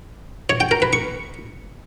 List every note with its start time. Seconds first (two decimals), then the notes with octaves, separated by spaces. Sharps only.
0.50 C#5
0.60 G5
0.71 A#4
0.82 B4
0.93 C#6